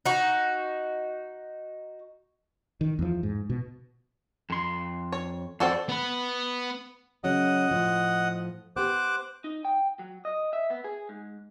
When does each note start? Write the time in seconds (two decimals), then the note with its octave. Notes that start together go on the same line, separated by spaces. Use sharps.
0.05 D#4 F#4
2.81 D#3
2.99 E2 F3
3.23 G#2
3.50 B2
4.50 F2 C6
5.12 C#5
5.60 F2 C4 F#4 A4 D5
5.89 B3 B5
7.24 C#3 F#3 C#4 D#5 F#5 D#6
7.71 A2 F3
8.76 B3 G4 C5 D6 F#6
9.44 D#4
9.65 G5
9.99 F#3
10.25 D#5
10.53 E5
10.70 B3
10.84 G#4
11.09 G#2